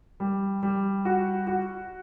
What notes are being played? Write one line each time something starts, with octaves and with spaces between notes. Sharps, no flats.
G3
G3
F#4
F#4